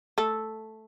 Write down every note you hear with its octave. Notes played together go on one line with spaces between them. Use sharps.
A3 A4